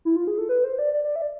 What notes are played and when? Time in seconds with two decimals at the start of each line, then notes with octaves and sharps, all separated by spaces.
0.05 E4
0.16 F4
0.27 G#4
0.38 A4
0.49 B4
0.64 C5
0.79 D5
0.93 D5
1.04 D5
1.16 E5
1.22 D5